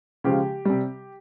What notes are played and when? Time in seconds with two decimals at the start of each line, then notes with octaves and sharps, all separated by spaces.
0.24 C#3 F3 G#3 G4
0.65 C3 G3